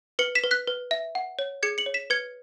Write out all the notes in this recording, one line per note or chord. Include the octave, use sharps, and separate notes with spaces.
B4 C#7 F#7
B6 E7
B4
F#6 B6
B4
E5
F#5
C#5
G#4 G#6 C#7
C#7 F#7
C#5
B6 E7
B4 G#6 C#7